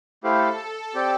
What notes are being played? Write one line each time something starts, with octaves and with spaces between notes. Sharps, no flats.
A3 E4 G4 A4 C5 F5
C4 G4 D5 G5